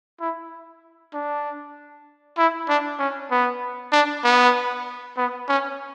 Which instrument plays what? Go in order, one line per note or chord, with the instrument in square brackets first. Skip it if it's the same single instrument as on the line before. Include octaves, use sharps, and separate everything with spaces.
[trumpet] E4
D4
E4
D4
C#4
B3
D4
B3
B3
C#4